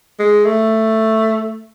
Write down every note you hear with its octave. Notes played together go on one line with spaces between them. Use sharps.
G#3
A3